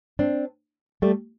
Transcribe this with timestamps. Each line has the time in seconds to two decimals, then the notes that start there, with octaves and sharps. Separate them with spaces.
0.19 C4 D4
1.02 G3 A3